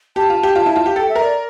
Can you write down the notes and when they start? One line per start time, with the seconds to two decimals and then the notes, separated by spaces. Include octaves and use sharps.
0.16 G4 A5
0.30 F4
0.43 G4
0.56 F4
0.66 E4
0.76 F4
0.86 G4
0.96 A4 G5
1.09 E5
1.15 A#4
1.22 D5